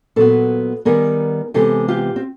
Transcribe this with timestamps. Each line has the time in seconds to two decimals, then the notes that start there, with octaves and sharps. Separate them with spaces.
0.16 A#2 F#3 B3 A4 B4
0.85 D#3 G3 B3 G#4 A#4
1.54 C3 E3 G#3 B3 G4 A4
1.88 F4 G4
2.16 C4